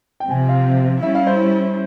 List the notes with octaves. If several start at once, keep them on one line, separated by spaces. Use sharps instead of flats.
G5
C3 F3 C4 G#5
F5
G3 C#4 E4 E5
F5
C5